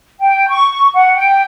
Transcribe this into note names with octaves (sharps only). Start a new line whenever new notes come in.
G5
C#6
F#5
G5